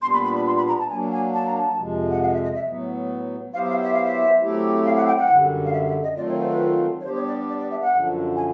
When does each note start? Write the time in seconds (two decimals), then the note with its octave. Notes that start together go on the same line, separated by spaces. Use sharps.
0.02 A#2 G3 B3 D4 C6
0.13 B5
0.24 B5
0.36 B5
0.46 C6
0.57 B5
0.68 A#5
0.79 A5
0.90 F#3 A#3 D4 G#5
1.12 G#5
1.34 A5
1.46 A#5
1.58 A5
1.77 F2 C3 F3 G#3
2.10 F#5
2.22 F5
2.28 D#5
2.33 E5
2.43 D#5
2.54 E5
2.65 A2 F#3 B3
3.53 F#3 B3 E4 G4 C5 F5
3.68 F5
3.82 E5
3.93 F5
4.04 E5
4.42 F#3 A3 C4 E4 G4
4.85 F5
4.96 F#5
5.07 G5
5.18 F#5
5.29 F#2 D3 G3
5.65 F5
5.72 E5
5.88 E5
6.03 D#5
6.16 D#3 F#3 A3 C4 F4 D5
6.28 C#5
6.39 C5
6.50 B4
7.00 C#5
7.04 G3 B3 D4 G4 C5
7.15 C#5
7.26 D5
7.49 D5
7.59 D5
7.70 E5
7.81 F#5
7.92 F#2 D3 F3
8.36 G#5